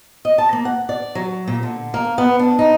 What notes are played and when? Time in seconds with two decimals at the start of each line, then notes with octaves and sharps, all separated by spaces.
0.25 D#5
0.38 A5
0.53 A#3
0.65 F#5
0.89 D5
1.15 F#3
1.47 A#2
1.63 D3
1.94 A#3
2.18 B3
2.39 D4
2.59 D#4